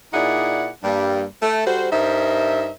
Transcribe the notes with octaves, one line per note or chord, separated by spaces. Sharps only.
A#2 D#4 E4 G#4 D5 F#5
G2 G3 A#3
A3 A4
G3 F#4 A4 C5
G2 D#4 A#4 C5 E5